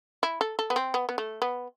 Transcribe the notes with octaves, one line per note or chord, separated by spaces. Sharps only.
E4
A4
A4
B3
C4
B3
B3
A3
B3